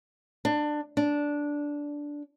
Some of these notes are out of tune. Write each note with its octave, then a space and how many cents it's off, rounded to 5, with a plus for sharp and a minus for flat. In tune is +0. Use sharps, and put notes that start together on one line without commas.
D4 +20
D4 -10